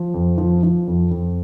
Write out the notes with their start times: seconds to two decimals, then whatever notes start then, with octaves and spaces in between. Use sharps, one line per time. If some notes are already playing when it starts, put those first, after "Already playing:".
Already playing: F3
0.14 F2
0.38 F3
0.63 F3
0.87 F2
1.11 F2